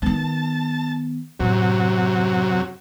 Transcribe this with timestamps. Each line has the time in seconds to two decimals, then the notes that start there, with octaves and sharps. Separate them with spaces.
0.02 D#3 B3 A5
1.40 F#2 A2 C3 F#3